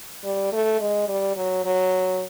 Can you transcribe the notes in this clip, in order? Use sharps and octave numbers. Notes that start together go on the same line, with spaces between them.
G3
A3
G#3
G3
F#3
F#3